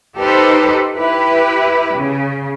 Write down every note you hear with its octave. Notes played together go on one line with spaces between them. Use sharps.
D#4 G4 A4 B4 C5
E4 G4 B4
C#3